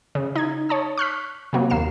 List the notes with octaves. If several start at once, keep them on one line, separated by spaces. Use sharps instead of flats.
C#3
D#4 G#6
C#5 A5 D#6
C#6 F6 F#6 B6
C3 F#3 A#3
D#2 A#3 C7 E7